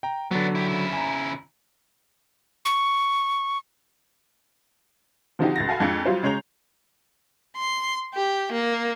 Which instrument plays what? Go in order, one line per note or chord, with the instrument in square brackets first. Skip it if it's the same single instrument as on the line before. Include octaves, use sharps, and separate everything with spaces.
[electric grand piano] G5 A#5
[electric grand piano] D3 F#3 [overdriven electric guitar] B3 D4
[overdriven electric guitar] E4 G4
C#3 E4
[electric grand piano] G#5 A#5
[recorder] C#6
[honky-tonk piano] D3 F3 C4 D#4 F#4 G4
C#2 A6 A#6
F#4 A4 F5 G#5 B5
F2 G#3 D4 F4 G#6 C#7
F#3 G3 F4 C5
C#3 G#3 C#5 A#5 G6 F7
[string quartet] C6
G4
A#3